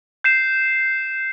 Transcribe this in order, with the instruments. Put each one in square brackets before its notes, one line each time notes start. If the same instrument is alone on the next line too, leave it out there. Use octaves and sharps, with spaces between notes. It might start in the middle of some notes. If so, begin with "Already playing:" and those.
[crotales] G6 C7 E7